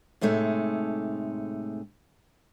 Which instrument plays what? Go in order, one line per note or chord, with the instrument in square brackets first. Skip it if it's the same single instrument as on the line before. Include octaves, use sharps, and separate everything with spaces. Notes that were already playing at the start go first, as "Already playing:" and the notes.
[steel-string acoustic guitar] A2 C3 G#3 A3 D#4